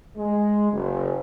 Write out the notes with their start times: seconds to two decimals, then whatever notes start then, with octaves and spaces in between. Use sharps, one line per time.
0.16 G#3
0.71 F#1